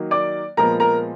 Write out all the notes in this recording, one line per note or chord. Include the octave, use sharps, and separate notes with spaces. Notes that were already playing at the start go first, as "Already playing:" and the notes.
Already playing: D#3 F#3 A#3
D5 D6
A#2 F3 G#3 B3 A#4 A#5
A#4 A#5